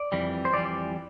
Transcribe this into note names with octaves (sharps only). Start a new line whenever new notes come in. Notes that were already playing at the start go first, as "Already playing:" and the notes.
Already playing: D5
F2 E3 G3
C5
F2 E3 G3 D5